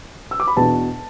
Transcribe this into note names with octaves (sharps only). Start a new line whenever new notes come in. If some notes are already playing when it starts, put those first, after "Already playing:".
E6
D6
B5
E2 B2 B3 D4 A5